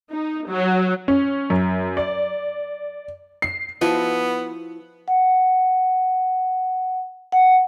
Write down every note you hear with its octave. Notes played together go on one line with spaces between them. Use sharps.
D#4
F#3
C#4
F#2
D5
C7
F3 B3 E4 F#4
F#5
F#5